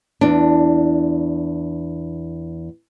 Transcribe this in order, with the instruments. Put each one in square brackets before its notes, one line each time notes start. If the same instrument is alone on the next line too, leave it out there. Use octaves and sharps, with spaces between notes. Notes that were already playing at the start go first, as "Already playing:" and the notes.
[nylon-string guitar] E2 D4